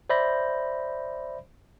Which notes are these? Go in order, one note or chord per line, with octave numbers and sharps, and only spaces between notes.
C5 D5 E5 B5 G6 A#6